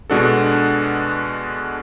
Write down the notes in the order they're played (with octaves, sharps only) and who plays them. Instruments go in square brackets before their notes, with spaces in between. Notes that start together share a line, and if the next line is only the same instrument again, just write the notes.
[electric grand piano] B2 G#3 D4 F#4 A4